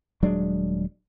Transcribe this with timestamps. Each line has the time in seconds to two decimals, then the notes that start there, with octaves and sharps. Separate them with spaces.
0.23 D#1 F#3 G#3 D4